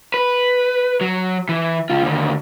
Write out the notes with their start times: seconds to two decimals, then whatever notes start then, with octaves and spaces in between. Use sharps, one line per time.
0.14 B4
1.01 F#3
1.49 E3
1.90 C#2 F4
2.03 D#2 D3